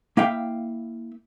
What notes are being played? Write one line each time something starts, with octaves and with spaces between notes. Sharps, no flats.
A#3 E4 E5 F5 G5